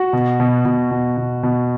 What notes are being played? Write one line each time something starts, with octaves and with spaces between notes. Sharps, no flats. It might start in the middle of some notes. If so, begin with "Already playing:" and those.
Already playing: F#4
B2
B2
B2
B2
B2
B2